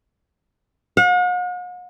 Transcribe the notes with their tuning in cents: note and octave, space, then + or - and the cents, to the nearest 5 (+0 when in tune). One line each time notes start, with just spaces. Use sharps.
F#5 -45